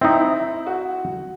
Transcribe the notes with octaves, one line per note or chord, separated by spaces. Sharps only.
C4 D#4 E4
F#4